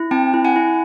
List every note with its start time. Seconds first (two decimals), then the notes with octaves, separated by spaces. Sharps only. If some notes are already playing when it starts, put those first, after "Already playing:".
Already playing: E4
0.11 C4 G5 A5
0.34 E4
0.45 F#5 G#5
0.56 E4